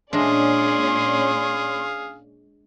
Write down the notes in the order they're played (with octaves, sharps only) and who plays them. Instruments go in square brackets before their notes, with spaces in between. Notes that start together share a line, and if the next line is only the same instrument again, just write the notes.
[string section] A#2 C#4 D5 [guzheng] G#3 D4 [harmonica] G#4 F5 [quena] C6